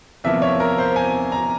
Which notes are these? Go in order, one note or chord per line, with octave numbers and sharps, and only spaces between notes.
E2 C3 F3 A#3 E5
C#5
A#4
C5
G#5
A#5